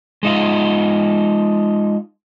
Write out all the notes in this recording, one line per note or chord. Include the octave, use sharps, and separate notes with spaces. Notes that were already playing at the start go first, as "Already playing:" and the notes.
G#3 D#4 F4